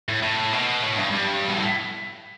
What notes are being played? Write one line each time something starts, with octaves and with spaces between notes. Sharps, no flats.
A2
A2
B2
A2
G2
G2
B2
A2